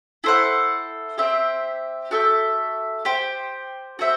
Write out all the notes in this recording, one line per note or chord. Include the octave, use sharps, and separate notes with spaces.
E4 A4 C5 F#5
C4 G4 C5 E5
F#4 A4 E5 G5
G4 C5 G5
F#4 C5 E5